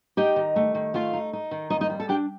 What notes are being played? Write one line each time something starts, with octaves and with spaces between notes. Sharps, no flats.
D#4 G4 G5
D#3
A3
D#3
A3 F4 F5
D#4
D#4
D#3
F2 D#4 D#5
D#4 D#5
G3
A4 A5
D4 G4 G5